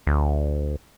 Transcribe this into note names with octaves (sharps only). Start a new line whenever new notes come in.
D2